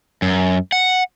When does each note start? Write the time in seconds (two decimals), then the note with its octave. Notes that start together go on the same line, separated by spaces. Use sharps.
0.22 F#2
0.72 F#5